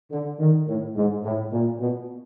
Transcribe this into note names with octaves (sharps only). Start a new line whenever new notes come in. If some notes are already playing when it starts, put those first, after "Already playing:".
D3
D#3
A2
G#2
A2
A#2
B2